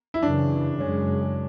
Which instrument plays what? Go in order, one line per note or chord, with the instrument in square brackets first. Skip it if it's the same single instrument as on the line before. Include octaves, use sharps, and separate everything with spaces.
[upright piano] E4
[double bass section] F#2 C#3 E3 [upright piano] D4
[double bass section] F#2 C#3 G#3 [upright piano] C#4